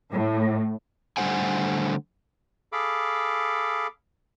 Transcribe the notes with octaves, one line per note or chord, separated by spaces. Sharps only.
A2
D3 G3 A3 C5 F#5 G#5
G#4 A4 F5 B5 D6